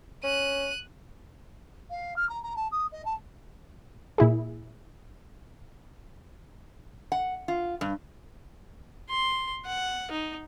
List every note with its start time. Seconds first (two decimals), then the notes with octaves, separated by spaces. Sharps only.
0.24 C#4 F#6 D#7
1.90 F5
2.16 F6
2.29 A#5
2.43 A#5
2.56 A5
2.71 D#6
2.92 D#5
3.05 A5
4.18 A#2 E4 G#4
7.12 F#5
7.48 F4
7.81 G2
9.09 C6
9.66 F#5
10.11 D#4